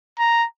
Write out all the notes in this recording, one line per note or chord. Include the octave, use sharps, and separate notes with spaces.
A#5